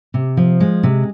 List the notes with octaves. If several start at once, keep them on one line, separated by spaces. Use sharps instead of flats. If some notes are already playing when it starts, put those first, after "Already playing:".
C3
F3
G#3
C3